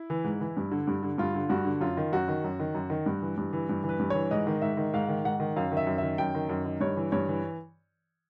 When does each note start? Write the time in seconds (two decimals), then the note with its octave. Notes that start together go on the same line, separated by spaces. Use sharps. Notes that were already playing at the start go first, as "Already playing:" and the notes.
Already playing: E4
0.10 E3
0.24 G#2
0.41 E3
0.57 G2
0.71 D3
0.87 G2
1.03 D3
1.18 G2 F4
1.34 D3
1.49 G2 F#4
1.65 D3
1.80 F#2 F4
1.97 D#3
2.12 F#2 F#4
2.28 D#3
2.44 F#2
2.60 D#3
2.74 F#2
2.90 D#3
3.06 G2
3.22 E3
3.37 G2
3.53 E3
3.69 G2
3.84 E3
3.89 B4
3.99 G2
4.10 E3 C#5
4.31 G#2 D#5
4.47 D#3
4.62 G#2 E5
4.77 D#3
4.93 G#2 F5
5.09 D#3
5.24 G#2 F#5
5.40 D#3
5.56 F#2 F5
5.72 D#3
5.77 E5
5.87 F#2
5.98 D#3 E5
6.18 F#2 G5
6.35 D#3
6.49 F#2
6.66 D#3
6.80 G2 C#5
6.97 E3
7.12 G2 C#5
7.28 E3